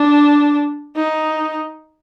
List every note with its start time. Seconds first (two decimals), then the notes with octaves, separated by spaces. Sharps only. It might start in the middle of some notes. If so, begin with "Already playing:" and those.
Already playing: D4
0.96 D#4